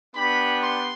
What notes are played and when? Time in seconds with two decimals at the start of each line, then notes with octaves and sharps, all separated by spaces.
0.15 B3 D4 G4 B5
0.62 C6